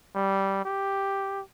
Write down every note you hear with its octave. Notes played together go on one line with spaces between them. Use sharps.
G3
G4